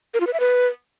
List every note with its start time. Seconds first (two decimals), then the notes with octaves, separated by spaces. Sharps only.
0.14 A#4
0.20 F4
0.27 B4
0.33 E5
0.40 B4